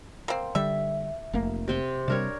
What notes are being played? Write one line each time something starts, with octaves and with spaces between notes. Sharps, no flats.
A#3 C4
D3 G3 E5
F1 A3 A#3
C3 C4 G5
C3 G3 D4 A#4 C#5